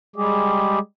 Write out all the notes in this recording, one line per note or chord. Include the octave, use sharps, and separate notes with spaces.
G3 G#3 G4 G#4